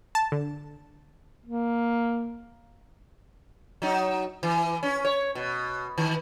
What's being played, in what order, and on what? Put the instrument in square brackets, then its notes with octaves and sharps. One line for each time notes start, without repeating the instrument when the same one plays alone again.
[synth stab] A5
D3
[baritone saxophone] A#3
[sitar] F#3 D#4
E3
C#4
C#5
B2
D#3